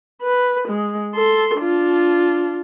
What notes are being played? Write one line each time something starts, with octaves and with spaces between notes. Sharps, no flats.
B4
G#3
A4 C6
D4 F4